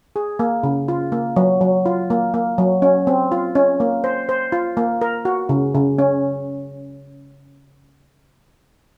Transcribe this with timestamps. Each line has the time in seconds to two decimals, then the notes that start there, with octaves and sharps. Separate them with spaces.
0.16 G#4
0.39 A#3
0.63 C#3
0.88 F4
1.12 A#3
1.36 F#3
1.61 F#3
1.86 F4
2.10 A#3
2.34 A#3
2.58 F#3
2.82 C#4
3.07 C4
3.32 F4
3.55 C#4
3.80 A#3
4.04 C5
4.29 C5
4.52 F4
4.77 A#3
5.01 A#4
5.25 F#4
5.49 C#3
5.75 C#3
5.98 C#4